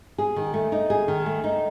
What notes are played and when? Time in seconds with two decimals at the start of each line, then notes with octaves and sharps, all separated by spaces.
0.18 G#4
0.36 D#3
0.54 A3
0.72 D#4
0.90 G#4
1.08 D#3
1.26 A3
1.44 D#4